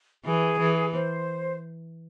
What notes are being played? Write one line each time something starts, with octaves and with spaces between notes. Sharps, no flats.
E3 G#4
E3
C5